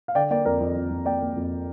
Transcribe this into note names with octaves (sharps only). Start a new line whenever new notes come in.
F5
D3 D5 G5
A#3 D5 G5
F2 A#4 D5
F2
F2
F2
A#3 D5 G5
A#3
F2